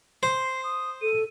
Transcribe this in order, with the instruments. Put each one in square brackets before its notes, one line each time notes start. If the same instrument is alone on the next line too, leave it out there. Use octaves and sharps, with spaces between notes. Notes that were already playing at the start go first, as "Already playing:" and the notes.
[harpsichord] C5 [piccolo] C7
[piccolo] D#6
[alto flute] A4 [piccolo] D#7